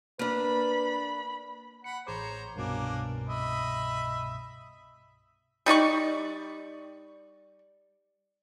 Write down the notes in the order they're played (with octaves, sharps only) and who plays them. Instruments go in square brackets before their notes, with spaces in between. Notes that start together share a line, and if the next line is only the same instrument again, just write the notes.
[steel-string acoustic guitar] A#3 D4 [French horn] B4 [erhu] B5
[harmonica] F#5 B5 [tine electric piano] C#7
[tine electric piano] A1 G#4 D6 [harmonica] C5 C#5 A#5
[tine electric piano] C2 G2 B2 [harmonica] A#3 C#4 D4
[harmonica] D#5 E5 B5
[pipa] G3 D#4 D5 C#6